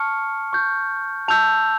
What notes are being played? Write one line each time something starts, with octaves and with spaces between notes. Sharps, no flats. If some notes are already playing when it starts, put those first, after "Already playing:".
Already playing: A5 C#6 F6 C#7
C#6 G6
A5 E6 G6 F7